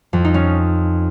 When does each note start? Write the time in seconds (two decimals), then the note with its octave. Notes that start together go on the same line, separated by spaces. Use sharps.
0.13 F2
0.24 D#4
0.34 C#4